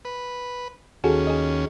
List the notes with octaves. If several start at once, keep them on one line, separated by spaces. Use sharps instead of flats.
B4
D#2 C#4 F#4 G#4 A4
G#4 D#5